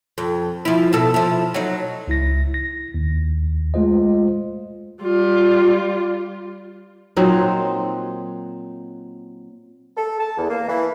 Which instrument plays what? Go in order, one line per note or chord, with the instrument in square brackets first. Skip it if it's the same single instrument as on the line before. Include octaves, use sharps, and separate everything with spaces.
[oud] F2
F3 E4
B2 A4
F3 E4
F#3 D#4
[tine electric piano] C#2 E4 A#6
A#6
D#2
G#3 A3 F4 C5 D#5
[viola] G3 F4
[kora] A#2 F#3 C4 D#4
[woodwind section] A4
A5
E2
A#3
E3